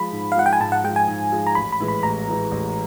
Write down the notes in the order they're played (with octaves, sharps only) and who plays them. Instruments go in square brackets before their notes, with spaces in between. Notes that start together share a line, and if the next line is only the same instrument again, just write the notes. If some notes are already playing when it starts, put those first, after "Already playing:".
Already playing: [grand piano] F3 G#3 [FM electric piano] B5
[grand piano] G#2
[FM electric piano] F5
[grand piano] F3 G#3 [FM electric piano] F#5
[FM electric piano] G5
G#5
[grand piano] G#2 [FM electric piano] A5
[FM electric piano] F#5
[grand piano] F3 G#3 [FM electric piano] G5
[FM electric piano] G#5
[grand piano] G#2
F3 G#3
[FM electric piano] A#5
[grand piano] A1 [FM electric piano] B5
[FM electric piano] B5
[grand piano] A2 E3 G#3
[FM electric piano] B5
[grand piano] A1 [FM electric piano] A#5
[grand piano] A2 E3 G#3
A1